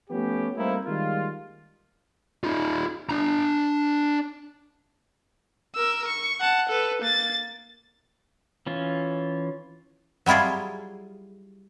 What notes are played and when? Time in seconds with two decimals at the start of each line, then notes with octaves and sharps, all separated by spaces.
0.10 F3 A3 B3 C#4 G4
0.57 G3 A3 A#3 C4 D#4 E4
0.86 D#3 G3 G#3 A#3 F4
2.44 D#4 F4
3.09 D4 A#5
5.75 A#4 E6
6.07 C#6
6.40 F#5 A5
6.69 A4 B4
7.02 A#3 A6
8.66 E3 C#4 F4
10.26 F#3 G3 E4 F4 G#4